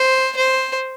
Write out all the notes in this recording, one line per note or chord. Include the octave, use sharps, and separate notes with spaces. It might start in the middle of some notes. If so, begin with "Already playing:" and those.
Already playing: C5
C5